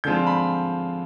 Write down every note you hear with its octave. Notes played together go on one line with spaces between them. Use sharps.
D3 F3 G#3 C4 F4 G6
B5